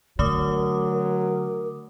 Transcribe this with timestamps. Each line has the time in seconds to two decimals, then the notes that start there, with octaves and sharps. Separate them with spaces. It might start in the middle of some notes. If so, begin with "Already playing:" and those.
0.19 D3 F#3 A3 A#4 D6 D#6